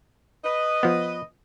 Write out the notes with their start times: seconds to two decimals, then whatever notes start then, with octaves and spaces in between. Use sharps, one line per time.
0.45 B4 D#5
0.83 F3 B3